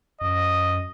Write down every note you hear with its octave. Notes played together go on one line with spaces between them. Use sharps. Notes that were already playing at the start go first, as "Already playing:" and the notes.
F#2 D#5